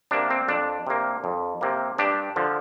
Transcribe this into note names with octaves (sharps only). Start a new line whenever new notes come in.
C3 A#3 D4
C4
F2 D4
C3 A#3
F2
C3 A#3
G2 D4 G4
D3 F3